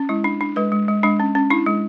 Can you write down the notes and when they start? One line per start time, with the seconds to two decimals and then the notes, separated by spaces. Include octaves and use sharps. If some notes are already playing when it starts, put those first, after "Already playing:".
Already playing: C#4
0.09 G#3 E4
0.24 D4
0.41 D4
0.56 G#3 B4
0.72 G#3
0.88 G#3
1.03 G#3 D4
1.20 C#4
1.35 C#4
1.50 D4 E4
1.66 G#3